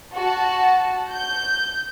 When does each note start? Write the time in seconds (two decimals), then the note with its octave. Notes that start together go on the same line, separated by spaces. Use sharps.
0.15 F#4 A5
1.12 G6